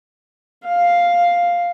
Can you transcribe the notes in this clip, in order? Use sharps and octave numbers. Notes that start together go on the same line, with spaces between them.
F5